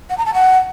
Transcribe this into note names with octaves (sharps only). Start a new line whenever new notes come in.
F#5
A#5
A5
F#5